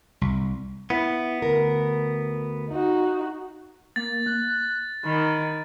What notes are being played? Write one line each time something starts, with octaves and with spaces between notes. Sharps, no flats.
C2
B3 E4
D2 A#4
D#4 F#4
A#3 A6
F#6
D#3 B5